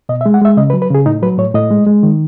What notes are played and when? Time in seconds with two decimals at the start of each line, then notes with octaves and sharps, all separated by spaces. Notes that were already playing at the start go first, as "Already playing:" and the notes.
0.09 B2 D#5
0.21 E5
0.26 G#3
0.34 F#5
0.41 G#3 E5
0.57 C#3 D#5
0.70 B4
0.73 F#3
0.82 B4
0.90 C#3 G#4
1.06 A2 D#4
1.23 F#3 B4
1.38 A2 C#5
1.55 A2 D#5
1.71 G#3
1.87 G#3
2.03 D#3